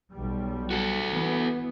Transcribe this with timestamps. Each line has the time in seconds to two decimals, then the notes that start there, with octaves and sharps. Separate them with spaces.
0.14 B1 G3
0.71 F#4 A4
1.11 E3 B3